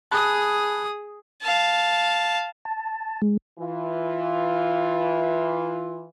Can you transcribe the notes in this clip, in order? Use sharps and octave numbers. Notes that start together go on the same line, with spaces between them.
G#4 A5 B5 D#6 F#6
F5 A5
A5
G#3
E3 F4